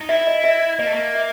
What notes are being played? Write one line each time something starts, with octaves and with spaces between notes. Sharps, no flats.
D#4
E4 E5
D#5
E5
A#3 D#5
A3
A#3
E5